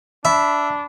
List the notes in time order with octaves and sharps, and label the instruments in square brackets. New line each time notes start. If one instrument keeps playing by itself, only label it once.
[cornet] D4 [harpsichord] E5 [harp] B5